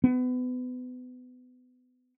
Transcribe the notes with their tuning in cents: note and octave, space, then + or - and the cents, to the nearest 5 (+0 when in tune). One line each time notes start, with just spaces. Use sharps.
B3 +30